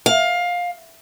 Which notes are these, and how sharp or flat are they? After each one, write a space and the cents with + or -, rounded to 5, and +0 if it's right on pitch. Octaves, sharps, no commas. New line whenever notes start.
F5 +20